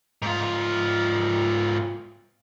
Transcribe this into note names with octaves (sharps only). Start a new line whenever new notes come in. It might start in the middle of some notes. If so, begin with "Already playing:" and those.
G#2 F4